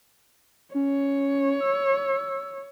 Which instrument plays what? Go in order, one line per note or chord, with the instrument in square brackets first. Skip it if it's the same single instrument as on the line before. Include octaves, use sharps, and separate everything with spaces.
[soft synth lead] C#4 [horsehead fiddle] C#5
[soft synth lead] E6